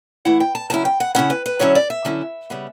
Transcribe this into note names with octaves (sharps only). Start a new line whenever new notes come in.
E3 A3 E4 F#5
G5
A5
C#3 F#3 C#4 E4 A5
G5
F#5
C#3 F#3 C#4 E4 F#5
B4
B4
D3 F#3 C#4 E4 C#5
D5
E5
D3 F#3 C#4 E4
C#3 G3 B3